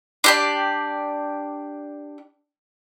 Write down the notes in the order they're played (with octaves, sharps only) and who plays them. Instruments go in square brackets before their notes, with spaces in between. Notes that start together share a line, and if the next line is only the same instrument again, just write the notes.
[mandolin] D4 G4 D5